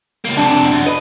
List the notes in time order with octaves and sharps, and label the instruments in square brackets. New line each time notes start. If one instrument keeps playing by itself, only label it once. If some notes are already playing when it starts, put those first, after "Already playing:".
[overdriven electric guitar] C#2 A#3
[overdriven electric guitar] F2 C3 [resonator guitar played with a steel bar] D4
[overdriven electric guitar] F#2
[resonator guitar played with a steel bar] B4 [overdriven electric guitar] D#5